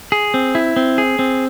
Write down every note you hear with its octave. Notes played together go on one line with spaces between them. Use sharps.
G#4
C4
E4
C4
G#4
C4